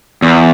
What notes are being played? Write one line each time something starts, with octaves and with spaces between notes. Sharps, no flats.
E2